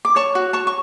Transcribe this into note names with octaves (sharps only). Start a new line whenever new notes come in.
D6
C#5 A5 C#6
F#4
C#5 A5 C#6
C#6